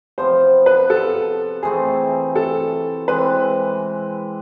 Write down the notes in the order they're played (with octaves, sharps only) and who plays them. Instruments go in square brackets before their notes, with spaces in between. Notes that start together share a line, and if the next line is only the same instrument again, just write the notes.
[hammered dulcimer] C3 F3 B3 [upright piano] C5
[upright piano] B4
A4
[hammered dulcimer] E3 A3 C4 [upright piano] G#4
[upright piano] A4
[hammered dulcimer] E3 G#3 C4 E4 [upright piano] B4